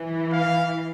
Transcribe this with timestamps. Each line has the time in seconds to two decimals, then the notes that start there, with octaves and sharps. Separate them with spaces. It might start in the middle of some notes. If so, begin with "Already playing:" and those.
Already playing: E3
0.33 F5